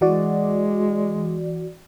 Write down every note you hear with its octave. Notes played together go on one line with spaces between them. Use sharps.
E3 G#3 F#4 D5